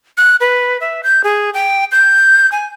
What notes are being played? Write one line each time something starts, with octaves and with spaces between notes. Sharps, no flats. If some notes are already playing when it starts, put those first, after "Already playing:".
F#6
B4
E5
G6
G#4
G5
G6
G#5